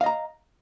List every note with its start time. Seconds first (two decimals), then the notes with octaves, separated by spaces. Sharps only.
0.01 F5
0.04 D#5
0.06 A#5